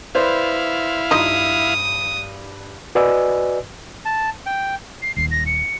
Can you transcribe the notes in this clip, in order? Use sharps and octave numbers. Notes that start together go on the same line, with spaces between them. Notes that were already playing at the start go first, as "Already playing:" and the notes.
E4 B4 C5 D5 F5
G2 D#4 F4 D#5 D#6
F#4 B4 D5 D#5 G#5 E6
A5
G5
C7
D#1 D#2 C7
A#6
C#7